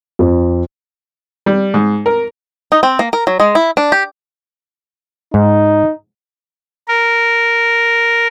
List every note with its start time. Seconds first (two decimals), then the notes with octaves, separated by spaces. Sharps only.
0.19 F2
1.46 G3
1.74 G#2
2.06 A#4
2.72 D#4
2.83 C4
2.99 A#3
3.13 A#4
3.27 F#3
3.40 G#3
3.55 E4
3.77 D4
3.92 G4
5.34 G#2 D#4
6.88 A#4